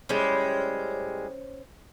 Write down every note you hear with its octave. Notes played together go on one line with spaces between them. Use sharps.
A2 G3 G#3 C#4 C5